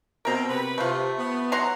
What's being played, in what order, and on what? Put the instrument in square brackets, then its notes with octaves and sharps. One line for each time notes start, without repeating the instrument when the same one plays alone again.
[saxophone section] B2 C4 [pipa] A#4 A#5
[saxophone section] C3 B4
[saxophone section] C3 [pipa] A3 F4
[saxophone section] B3
[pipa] F#3 A#5 C6 [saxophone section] F#5